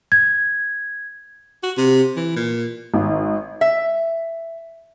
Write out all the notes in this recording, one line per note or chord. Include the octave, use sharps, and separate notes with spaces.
G#6
F#4
C3
E3
A#2
G#1
E5